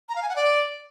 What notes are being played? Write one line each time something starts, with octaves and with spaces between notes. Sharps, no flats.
A#5
F5
G#5
F#5
D5